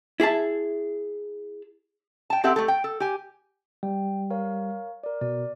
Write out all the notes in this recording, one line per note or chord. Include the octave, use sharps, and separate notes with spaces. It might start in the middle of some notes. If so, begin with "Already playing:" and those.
E4 G#4 E5 A5
G5 A5
C4 G4 A4 E5 F#5
A3 G4 A4
G5
A4
G4 G#5
G3 G5
A#4 C#5 F5
A#4 D5
B2 D5